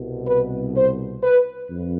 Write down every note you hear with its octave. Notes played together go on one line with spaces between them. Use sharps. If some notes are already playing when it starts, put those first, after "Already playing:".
Already playing: C2 B2
B4
C5
B4
F2